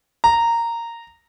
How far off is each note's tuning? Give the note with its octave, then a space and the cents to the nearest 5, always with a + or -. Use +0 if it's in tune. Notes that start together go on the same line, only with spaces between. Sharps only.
A#5 -10